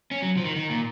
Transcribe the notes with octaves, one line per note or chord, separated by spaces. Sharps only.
C#4
F#3
F3
D#3
D#3
A#2